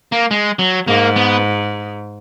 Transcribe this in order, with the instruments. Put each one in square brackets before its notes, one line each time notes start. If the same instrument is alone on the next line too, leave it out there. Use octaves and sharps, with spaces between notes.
[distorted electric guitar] A#3
G#3
F#3
[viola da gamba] G#2 [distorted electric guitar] A#3
[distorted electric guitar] B3